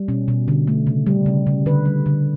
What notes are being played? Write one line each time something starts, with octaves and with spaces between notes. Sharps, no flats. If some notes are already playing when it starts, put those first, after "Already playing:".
Already playing: G3
B2 C#4
B2
D3
A3
C#3
G3
C#3
C#3
D3 B4
G3
D3